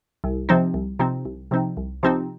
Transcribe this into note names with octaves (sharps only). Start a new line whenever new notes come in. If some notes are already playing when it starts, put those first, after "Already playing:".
C2
C3 F3 C4 D#4
C2
C3 F3 C4 D#4
C2
C3 F3 C4 D#4
C2
C3 F3 C4 D#4